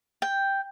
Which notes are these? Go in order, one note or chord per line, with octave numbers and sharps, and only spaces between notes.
G5